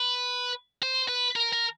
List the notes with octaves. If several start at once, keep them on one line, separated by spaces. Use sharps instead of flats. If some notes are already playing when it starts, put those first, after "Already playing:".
Already playing: B4
C5
B4
A#4
A#4